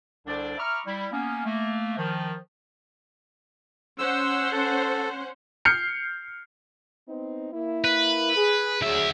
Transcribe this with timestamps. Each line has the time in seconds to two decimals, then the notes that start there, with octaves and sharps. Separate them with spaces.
0.27 C2 D3 D4 C5 D5
0.58 E5 A#5 B5 C#6 D6 F6
0.86 G3 E4
1.12 A#3 B3 C#4
1.45 A3 A#3
1.97 D#3 F3
3.99 C#4 C5 F#5 E6
4.52 A4
5.65 F6 G6 C7 C#7
7.08 B3 C4 D#4
7.53 A#3 E4
7.84 B4
8.36 G#4
8.82 D2 F#3 G#4 E5